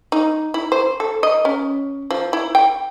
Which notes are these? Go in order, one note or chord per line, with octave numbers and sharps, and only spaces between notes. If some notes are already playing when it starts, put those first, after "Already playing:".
D#4
E4
C5
A4
D#5
C#4
F3
E4
G5